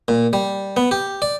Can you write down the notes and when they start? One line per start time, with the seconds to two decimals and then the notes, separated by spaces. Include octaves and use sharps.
0.08 A#2
0.33 G3
0.77 B3
0.91 G4
1.22 D5